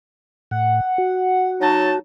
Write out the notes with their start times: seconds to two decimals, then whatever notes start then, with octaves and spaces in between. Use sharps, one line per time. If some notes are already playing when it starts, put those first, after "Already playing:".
0.51 A2 F#5
0.98 F#4
1.61 F#3 D#4 A5